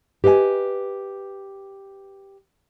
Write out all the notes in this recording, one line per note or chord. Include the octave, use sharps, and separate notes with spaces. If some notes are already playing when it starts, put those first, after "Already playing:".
G4 B4 D#5 F5 G#5